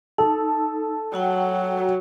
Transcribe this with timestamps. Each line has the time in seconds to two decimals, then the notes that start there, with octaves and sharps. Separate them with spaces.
0.18 D#4 A4
1.14 F#3 F#4 F#5 G5